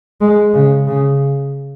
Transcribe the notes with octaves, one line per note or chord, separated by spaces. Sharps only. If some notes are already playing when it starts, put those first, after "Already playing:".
G#3
C#3
C#3